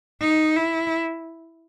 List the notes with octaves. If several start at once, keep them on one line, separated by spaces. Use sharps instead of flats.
D#4
E4